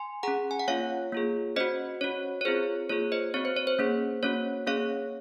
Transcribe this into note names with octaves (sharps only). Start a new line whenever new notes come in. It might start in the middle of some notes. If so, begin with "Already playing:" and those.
Already playing: G#5 C6
C#4 G#4 F#5 A#5
G#5
F#5
A#3 C#4 F4 C#5 F5
A#3 F4 G#4
C#4 F#4 C5 D#5
C#4 F#4 C#5
C#5
C4 F4 G#4 C5
A#3 F4 G#4 C#5
C5 D#5
C4 F#4 C#5
C5
C#5
C5
A#3 C#4 G#4
A#3 C#4 F#4 C#5
A#3 C#4 G#4 C#5 F5